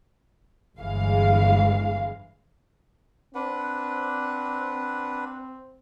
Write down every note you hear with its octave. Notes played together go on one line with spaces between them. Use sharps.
G1 E3 G#3 F5
C4 D4 B4 F#5